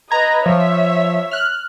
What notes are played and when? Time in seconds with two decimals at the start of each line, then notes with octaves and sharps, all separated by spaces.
0.11 B4 D#5 A#5 G#6
0.46 F3 C#5 E5
1.31 F6 F#6